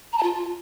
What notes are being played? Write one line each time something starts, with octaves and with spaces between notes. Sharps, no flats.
A#5
A5
F4